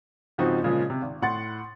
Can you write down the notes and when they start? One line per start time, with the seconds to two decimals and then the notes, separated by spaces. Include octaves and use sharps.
0.38 G#2 C#3 F3 C4 D#4 F#4
0.63 A#2 C#3 F3 G#3
0.90 C3
1.02 G#1
1.22 A2 F#5 C6 A6